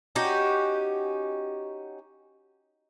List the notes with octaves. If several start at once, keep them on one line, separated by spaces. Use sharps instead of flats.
C#4 D#4 F#4 G4